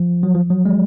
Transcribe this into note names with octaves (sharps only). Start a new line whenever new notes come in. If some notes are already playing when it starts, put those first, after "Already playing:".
Already playing: F3
F#3
F3
F#3
G#3